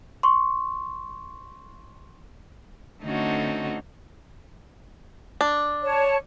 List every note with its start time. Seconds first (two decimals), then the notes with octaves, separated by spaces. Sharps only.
0.23 C6 C#6
3.03 D3 A3 C4 C#4 D#4 F#4
5.41 D4
5.82 C#5 A5